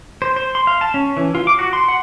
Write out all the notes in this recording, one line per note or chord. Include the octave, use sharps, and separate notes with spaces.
C5
C5
C6
F5
A5
C#4
E3
F4
D6
F#4
C6
F#5